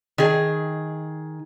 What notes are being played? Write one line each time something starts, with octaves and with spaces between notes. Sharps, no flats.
D#3 G#4